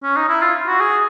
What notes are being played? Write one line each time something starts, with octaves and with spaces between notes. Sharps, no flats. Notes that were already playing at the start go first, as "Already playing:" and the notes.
C#4
D#4
E4
F4
F#4
G#4